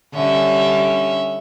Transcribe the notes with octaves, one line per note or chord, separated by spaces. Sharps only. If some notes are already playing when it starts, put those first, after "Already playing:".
D3 G3 C#4 E5